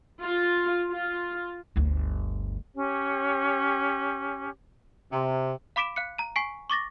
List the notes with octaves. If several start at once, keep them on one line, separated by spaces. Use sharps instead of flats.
F4
F4
G1 D2
C#4 G4 C#5
C3
F5 B5 D6 B6 D7 E7
F5 F#6 C#7
A#5 D#7
G#5 C#6 B6 C7 D7
C#6 D6 A6 A#6